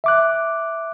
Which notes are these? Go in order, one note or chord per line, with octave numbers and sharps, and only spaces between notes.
E5 D6 F#6